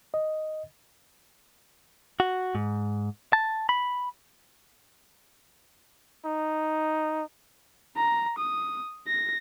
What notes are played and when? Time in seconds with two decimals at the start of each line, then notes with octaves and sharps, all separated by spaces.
0.14 D#5
2.20 F#4
2.55 G#2
3.33 A5
3.69 B5
6.26 D#4
7.97 A#5
8.39 D#6
9.07 A#6